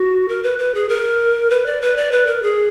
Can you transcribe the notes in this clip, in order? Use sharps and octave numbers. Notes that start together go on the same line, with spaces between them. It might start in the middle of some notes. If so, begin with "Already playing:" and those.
Already playing: F#4
A#4
B4
B4
G#4
A#4
B4
D5
B4
D5
B4
A#4
G#4